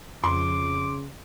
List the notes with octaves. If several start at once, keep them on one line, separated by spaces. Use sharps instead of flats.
F2 C#3 C6 D6